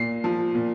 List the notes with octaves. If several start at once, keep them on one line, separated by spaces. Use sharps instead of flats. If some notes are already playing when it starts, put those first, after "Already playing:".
Already playing: A#2 C7
F3
A#2